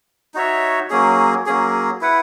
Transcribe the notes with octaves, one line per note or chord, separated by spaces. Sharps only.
D#4 F#4 C#5 E5
F#3 A#3 C#4 G#4
F#3 A#3 C#4 G#4
E4 B4 F#5